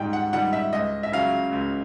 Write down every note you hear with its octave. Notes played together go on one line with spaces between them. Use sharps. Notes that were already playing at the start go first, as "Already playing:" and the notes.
Already playing: G#2 D#3 G3 G5
F#5
D#3 G3 F#5
E5
C#2 D#5
E5
C#3 F#3 F5
C#2